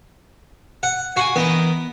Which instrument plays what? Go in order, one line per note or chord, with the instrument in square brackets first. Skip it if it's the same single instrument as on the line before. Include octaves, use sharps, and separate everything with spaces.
[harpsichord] F#5
[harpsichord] F#4 [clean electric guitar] F5 F#5 G#5
[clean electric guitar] E3 A#4 D#5 [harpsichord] B3